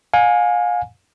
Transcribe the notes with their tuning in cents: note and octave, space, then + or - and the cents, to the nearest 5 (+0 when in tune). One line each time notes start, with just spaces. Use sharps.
F5 +35 G#5 -5